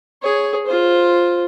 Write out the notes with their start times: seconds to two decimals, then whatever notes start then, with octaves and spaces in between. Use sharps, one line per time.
0.23 G#4 C#5
0.66 F4 C5